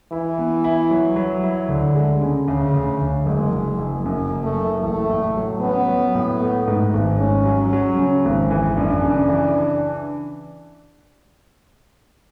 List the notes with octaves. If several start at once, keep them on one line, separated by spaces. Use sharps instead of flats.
E3 E4
B3
E4
F#3
F#3
E4
D2 D3
G#3
C#3
D2 C#3
D2
D2
F#1 G#3
F#1
F#1
F#2
F#1
A3
F#1
A1 A3
A2
F#3
B3 C#4
F#3
A2
A3
G#2
G#1
G#2 C#4
F#3
F#3
C#3
G#1
E3
F#2 D4
C#3
E3